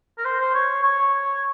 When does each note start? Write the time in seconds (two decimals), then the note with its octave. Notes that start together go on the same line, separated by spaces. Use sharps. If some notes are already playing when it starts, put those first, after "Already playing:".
0.17 A#4
0.25 C5
0.39 C5
0.54 C#5
0.83 C#5